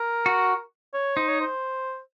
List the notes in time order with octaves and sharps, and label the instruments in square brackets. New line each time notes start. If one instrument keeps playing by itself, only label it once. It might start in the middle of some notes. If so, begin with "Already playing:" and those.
Already playing: [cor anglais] A#4
[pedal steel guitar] F#4
[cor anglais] C#5
[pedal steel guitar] D#4 [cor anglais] C5
[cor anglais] C#5
C5